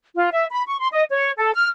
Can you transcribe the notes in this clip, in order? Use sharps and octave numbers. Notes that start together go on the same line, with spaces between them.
F4
E5
B5
C#6
C6
D#5
C#5
A4
F6